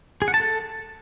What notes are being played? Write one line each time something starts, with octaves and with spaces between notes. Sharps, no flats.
G#4
F#5
A5
A4